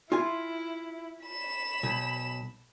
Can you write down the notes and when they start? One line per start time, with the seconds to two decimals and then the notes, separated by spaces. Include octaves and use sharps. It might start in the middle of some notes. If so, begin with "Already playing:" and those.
0.12 E4 F4 G#5
1.24 B5 E7
1.83 B1